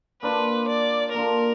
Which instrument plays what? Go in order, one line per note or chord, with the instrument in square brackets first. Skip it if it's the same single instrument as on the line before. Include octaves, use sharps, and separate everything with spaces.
[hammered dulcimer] A#3 D4 F4 [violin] B4
[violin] D5
[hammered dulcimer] A#3 D4 F4 [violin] A#4